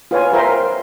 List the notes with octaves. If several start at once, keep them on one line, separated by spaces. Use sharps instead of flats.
F4 B4 C#5 G#5
F4 A#4 C5 E5 G5 C6